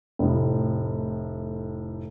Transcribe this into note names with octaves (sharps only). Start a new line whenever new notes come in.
F1 A2